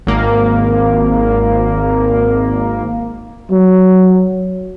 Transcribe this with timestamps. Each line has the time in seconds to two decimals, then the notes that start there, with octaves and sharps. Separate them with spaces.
0.07 G#1 A#3
3.51 F#3